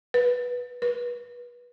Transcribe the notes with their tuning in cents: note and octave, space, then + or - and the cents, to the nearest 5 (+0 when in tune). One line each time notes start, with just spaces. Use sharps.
B4 -10
B4 -25